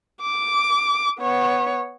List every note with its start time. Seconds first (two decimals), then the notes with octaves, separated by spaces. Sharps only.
0.22 D6
1.20 B3 C#5